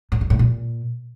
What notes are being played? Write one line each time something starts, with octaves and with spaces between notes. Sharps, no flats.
A2
D3
A2
A#2